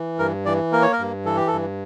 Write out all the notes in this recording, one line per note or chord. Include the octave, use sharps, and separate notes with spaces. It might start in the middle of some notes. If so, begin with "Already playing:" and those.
Already playing: E3
G2 A#4
E3 D5
A#3 A#4
C#5
A#4
G2
E3 A4
G4
A4
G2